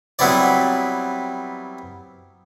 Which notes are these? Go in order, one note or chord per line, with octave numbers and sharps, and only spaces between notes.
F#3 G3 B3 C4 E4 D5